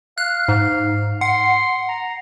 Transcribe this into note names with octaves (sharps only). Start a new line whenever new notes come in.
F5 F#6
G#2
F#5 C6
A#5